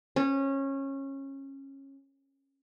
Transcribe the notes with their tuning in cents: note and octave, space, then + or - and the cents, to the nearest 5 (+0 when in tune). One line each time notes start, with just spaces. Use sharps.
C#4 -20